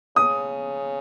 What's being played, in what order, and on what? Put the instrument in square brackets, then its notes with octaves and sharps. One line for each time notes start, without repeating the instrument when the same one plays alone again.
[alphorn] C#3 [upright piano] D#6